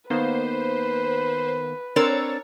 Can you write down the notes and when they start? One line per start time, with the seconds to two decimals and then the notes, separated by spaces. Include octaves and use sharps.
0.10 D#3 A#3 B3 B4 C5
1.96 C4 D4 A#4 C#5 E6 A6